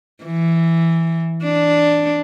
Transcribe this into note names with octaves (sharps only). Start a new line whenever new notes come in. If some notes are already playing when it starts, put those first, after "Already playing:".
E3
D4